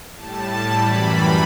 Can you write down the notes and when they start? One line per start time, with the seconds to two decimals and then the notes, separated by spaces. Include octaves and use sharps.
0.15 A2 G3 A5
0.74 F#2 E3 G3 B5